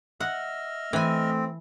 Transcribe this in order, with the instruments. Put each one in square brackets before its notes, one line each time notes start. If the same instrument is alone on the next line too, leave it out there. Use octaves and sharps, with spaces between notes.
[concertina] D#5 E5 F6 [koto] F#5
[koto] E3 G#5 [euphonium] A3 [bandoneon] C4